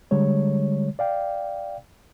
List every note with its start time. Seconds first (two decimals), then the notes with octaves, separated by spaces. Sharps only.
0.11 D3 G3 G#3 C#5
0.99 D5 F5 G5